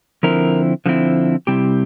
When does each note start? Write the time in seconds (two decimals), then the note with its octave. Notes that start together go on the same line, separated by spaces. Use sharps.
0.23 D3 F3 C4 E4 A#4
0.86 D3 F3 C4 E4
1.47 C3 G3 C4 E4 G4